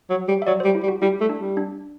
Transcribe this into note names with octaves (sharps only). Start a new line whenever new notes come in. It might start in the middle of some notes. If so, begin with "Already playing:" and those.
F#3
G3
E5
F#3 D5
G3 C5
E4
G3
F#4
G3 E4
A3
D4
G3
D4